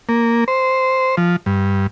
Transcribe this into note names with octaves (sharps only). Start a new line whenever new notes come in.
A#3
C5
F3
G2